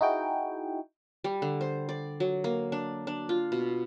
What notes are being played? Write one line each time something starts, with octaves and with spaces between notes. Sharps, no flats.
D#4 E4 F#4 G#4 G5
G3
D3
C5
D5
F#3
A#3
D4
D4
F4
B2